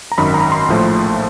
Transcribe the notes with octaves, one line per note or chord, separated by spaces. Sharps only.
A#5
G#1 F#2 D#3 B5
A#5
C6
A#1 A2 F3 A3